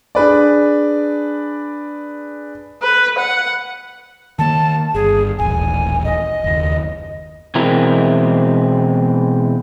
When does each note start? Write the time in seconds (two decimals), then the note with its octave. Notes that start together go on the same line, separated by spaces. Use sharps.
0.15 D4 G#4 B4 D5
2.83 B4
3.19 F#5
4.39 D#3 A#3 A5
4.94 G1 G#4
5.39 D#1 A1 G#5
6.05 D#5
6.44 F#1 D#2
7.55 B2 E3 G#3 C4 E4 A#4